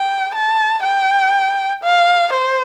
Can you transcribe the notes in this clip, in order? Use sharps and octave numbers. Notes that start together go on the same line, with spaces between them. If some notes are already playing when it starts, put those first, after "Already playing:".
Already playing: G5
A5
G5
F5
C5